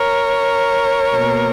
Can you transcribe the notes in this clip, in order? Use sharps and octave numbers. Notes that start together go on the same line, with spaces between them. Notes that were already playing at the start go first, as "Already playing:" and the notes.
Already playing: A#4 C#5
B2 A#3